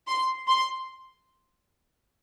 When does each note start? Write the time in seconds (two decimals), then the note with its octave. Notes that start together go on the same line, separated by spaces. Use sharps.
0.08 C6
0.48 C6